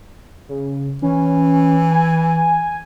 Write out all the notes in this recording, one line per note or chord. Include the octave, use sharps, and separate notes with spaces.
C#3
E3 C#4
G#5